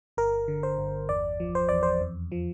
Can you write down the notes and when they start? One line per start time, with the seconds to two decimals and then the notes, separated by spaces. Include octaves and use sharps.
0.17 G1 A#4
0.48 D3
0.63 C5
0.78 G1
1.09 E2 D5
1.40 F3
1.55 C5
1.69 E2 D5
1.83 C5
2.01 F2
2.32 F3